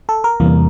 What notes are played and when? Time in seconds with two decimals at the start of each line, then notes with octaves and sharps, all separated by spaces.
0.09 A4
0.24 A#4
0.40 E2 C3 E3 G3 A#3